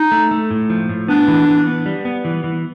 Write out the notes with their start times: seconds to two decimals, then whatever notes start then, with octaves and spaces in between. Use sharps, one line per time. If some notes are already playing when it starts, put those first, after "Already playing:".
Already playing: D#4
0.12 A3
0.31 A3
0.51 A2
0.70 F3
0.89 A2
1.08 B3 D4
1.28 E3
1.48 E3
1.67 B3
1.86 G3
2.05 B3
2.25 E3
2.44 E3